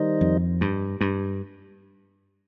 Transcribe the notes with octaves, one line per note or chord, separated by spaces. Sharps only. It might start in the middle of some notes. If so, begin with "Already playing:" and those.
Already playing: D#3 G3 D#4 C5 D#5
F2
G2
G2